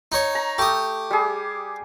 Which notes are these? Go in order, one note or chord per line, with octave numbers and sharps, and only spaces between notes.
D#4 C#5
A#5
A3 G4 D#6
G3 G#4